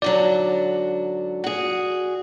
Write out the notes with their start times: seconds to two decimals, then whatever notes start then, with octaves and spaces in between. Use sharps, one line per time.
0.02 G#2 D3 F#3 D5
1.44 F#4 G#4